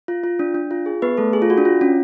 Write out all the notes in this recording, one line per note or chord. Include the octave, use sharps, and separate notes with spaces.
F4
F4
D4
D4
F4
G#4
B3 B4
A3 A4
G#4
F4
F#4
D4
F4
C#4